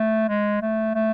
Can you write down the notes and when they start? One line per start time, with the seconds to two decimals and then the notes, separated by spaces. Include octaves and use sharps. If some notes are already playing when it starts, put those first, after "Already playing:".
Already playing: A3
0.29 G#3
0.62 A3
0.95 A3